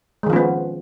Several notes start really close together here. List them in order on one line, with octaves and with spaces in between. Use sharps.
G#3 D#3 F3 C#4 B3